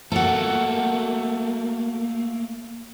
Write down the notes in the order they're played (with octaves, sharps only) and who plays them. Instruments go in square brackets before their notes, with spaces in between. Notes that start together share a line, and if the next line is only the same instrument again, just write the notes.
[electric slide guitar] A3 A#3 [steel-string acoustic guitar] F#4 A4